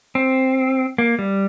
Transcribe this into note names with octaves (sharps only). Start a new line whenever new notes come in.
C4
A#3
G3